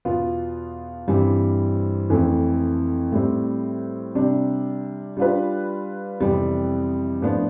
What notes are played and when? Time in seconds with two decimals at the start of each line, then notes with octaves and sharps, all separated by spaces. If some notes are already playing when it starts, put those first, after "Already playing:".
0.05 E2 B2 B3 F4
1.07 G2 E3 G3 C4
2.10 F2 E3 A3
3.12 A2 G3 C4
4.15 C3 G3 D4
5.17 G3 D4 F4 B4
6.20 F2 C3 E3 G3 B3
7.22 A2 F3 B3 D4